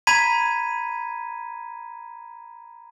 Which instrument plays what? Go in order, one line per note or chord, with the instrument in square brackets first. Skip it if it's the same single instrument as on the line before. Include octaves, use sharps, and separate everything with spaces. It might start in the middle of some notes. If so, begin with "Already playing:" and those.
[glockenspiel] A#5 B5 G#6 B6 D#7